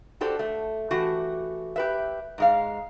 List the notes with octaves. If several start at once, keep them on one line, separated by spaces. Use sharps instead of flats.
F#4 G4 A4 C5 D5
A3
E3 A3 F#4 G4
G4 B4 E5
G#2 G#3 F5